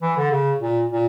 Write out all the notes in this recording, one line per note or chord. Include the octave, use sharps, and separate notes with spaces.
E3
D3
C#3
A#2
A#2